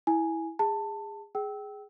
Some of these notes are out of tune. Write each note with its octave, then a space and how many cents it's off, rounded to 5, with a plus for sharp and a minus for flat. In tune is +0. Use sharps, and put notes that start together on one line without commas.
E4 -10 G#5 +0
G#4 -25 A5 +15
G#4 +0 G5 -25 E6 -20